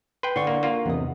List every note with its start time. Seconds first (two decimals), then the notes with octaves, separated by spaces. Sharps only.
0.23 B4 G5 C6
0.36 D3 C6 C#6
0.47 A#3
0.63 A#3 F4
0.86 E2 C3 B3 D#5